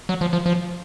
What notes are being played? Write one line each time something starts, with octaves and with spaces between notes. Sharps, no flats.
F#3
F3
F3
F3